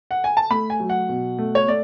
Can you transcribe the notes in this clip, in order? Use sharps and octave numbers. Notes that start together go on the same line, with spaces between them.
F#5
G#5
A5
A3 B5
G#5
F#3
F#5
B2
A3
C#5
A3 D5